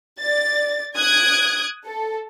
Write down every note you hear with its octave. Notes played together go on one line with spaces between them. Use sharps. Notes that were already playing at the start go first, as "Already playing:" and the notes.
D5 A6
D#6 F#6 G#6 D7
A4